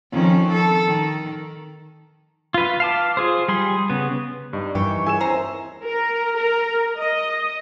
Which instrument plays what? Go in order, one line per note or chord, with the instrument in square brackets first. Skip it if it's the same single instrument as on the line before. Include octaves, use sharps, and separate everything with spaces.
[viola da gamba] F2 D#3 C#4
A4
D#3
[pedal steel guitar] F4 B4
F5 A5 D6
F4 G#4 C5
G3 G#4 C6
C#3 B3
[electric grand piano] G2 [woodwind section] G3 D#4
[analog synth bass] G2 [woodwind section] D#3 C#6 [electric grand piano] E3 [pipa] G4
[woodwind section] C#2 [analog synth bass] E4 [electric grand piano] G#5 E6 E7
[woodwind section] D#2 C4 [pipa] C#4 C5 A#5
[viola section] A#4
A#4
D#5